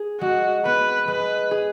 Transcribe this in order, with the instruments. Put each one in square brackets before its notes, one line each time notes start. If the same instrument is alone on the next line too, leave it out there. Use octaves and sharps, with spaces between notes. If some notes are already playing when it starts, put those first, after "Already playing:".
Already playing: [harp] G#4
[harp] G#3 [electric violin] F#4
[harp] B3 [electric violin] B4
[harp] G#3 [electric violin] B4
[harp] G#4